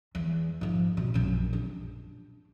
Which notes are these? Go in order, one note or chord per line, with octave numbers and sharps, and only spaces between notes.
E2
G#2 F3
B2
A#1 F#2
D4